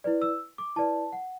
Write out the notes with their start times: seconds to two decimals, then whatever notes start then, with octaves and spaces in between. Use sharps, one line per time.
0.04 E4 B4 D5
0.22 E6
0.58 D6
0.76 E4 B4 D5 A5
1.12 F#5